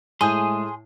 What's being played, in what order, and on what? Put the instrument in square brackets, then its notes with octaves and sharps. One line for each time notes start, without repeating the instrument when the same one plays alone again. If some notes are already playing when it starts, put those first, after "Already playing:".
[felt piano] A2 [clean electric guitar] G#3 A3 [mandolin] G#4 [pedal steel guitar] C6 D#6 G6